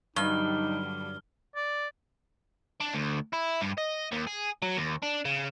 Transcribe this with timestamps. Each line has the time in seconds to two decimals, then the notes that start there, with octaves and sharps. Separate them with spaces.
0.16 G2 D3 F#3 G3 D#4 F6 G7
1.55 D5
2.80 D4
2.93 D2
3.33 E4
3.61 G2
3.78 D#5
4.12 D#2
4.27 G#4
4.62 F#3
4.77 D#2
5.02 D4
5.25 C#3